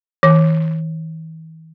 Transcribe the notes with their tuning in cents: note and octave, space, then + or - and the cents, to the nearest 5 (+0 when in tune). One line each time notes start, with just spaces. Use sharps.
E3 -45